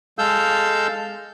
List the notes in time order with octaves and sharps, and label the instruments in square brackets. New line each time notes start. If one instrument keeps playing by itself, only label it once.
[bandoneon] G#3 A4 F5 E6 G6